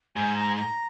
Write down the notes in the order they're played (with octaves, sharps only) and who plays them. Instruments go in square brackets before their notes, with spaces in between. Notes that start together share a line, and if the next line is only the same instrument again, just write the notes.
[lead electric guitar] G#2 [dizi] G#5
[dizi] A#5
A#5